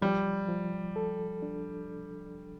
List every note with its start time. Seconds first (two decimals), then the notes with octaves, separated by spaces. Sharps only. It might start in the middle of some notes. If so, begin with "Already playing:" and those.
0.01 F3 G3
0.49 F3
0.96 A4
1.42 D4